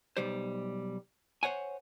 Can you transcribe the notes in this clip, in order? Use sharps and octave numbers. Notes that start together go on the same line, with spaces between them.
B1 G3 C5
C5 C#5 F#5 G#5